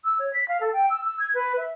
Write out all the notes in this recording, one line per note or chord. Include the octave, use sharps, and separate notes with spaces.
E6
C#5
B6
F5
A4
G5
E6
E6
G#6
B4
E5